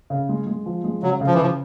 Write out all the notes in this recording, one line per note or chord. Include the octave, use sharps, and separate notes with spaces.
C#3
G#3
G#3
F3
G#3
C#3 F#3
C#3
F3
E3
C#3 F3